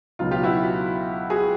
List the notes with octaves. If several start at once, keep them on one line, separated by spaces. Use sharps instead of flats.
C#2 B2 F#3 D#4 F4
F4 G4
E4 F#4
F#4 G#4